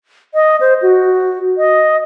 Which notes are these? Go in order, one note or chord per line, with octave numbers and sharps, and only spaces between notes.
D#5
C5
F#4
D#5